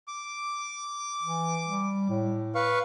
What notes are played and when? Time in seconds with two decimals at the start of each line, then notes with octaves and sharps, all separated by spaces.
0.08 D6
1.23 E3
1.66 G3
2.09 A2
2.55 B4 F5 C#6